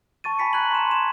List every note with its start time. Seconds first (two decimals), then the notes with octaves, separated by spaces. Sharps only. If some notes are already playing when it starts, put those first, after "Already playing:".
0.24 A5 C#6 A6 D#7
0.39 G#5 B5 B6 C#7
0.53 A#5 F#6 G#6 F#7
0.72 C6 E7
0.91 E7